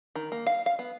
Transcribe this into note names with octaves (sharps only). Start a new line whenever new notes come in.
D#3
A#3
F5
F5
B3